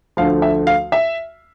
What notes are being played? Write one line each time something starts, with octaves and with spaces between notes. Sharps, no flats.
D2 D3 F3 A3 F5
E5
F5
E5